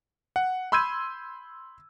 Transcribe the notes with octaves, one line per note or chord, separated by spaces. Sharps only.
F#5
B5 C6 E6 G6 G#6 D#7